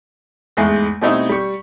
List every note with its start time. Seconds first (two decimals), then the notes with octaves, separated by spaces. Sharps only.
0.57 E2 G#2 G#3 A3
1.02 B2 G3 A3 C4 D#4 E4
1.29 G3 C#6